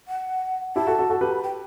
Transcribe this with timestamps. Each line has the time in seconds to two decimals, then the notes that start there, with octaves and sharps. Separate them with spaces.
0.08 F#5
0.76 E4 G4 A5
0.87 F#4 A4
0.98 F#4 A4
1.10 F#4 A4
1.21 G4 B4 A5
1.32 B5
1.44 G5